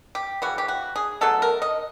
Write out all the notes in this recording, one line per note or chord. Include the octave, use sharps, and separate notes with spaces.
G4
C#3 E3 G3 F#4
G4
F#4
G#4
B2 F#3 A3 A4
A#4
D#5